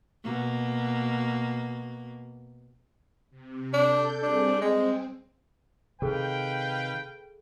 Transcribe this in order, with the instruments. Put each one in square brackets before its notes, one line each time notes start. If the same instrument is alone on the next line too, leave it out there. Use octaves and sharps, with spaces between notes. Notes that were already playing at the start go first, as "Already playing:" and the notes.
[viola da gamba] B2 A#3
[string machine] C3
[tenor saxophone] D4 [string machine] A4 G6
[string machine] G3 C4 G#4 [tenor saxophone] D4
[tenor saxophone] G#3 [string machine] C4
[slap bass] C3 D#3 [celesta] G#4 A4 [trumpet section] B4 F5 G5